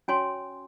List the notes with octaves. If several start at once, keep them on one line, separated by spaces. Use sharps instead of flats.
C#4 F#4 C#5 G#5 C6